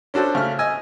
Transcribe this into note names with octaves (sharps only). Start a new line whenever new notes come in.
C#4 D4 F#4 A4 C5
C#3 A3 F6
D#5 G#5 E6